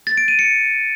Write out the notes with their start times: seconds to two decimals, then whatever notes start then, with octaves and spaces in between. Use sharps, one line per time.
0.07 A6
0.17 D7
0.28 D#7
0.39 C#7